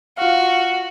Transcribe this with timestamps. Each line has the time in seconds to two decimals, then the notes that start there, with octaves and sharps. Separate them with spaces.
0.17 F4 F#4 F5